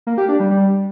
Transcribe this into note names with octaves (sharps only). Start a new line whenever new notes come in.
A#3
G4
D4
G3
G3